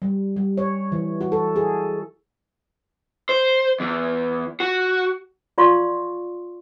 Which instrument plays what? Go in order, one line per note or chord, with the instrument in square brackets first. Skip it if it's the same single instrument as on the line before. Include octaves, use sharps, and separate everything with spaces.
[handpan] G3
G3
C#5
E3
F#4
A4
G#4
[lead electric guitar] C5
E2
F#4
[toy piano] F4 D5 F5 C6 C#6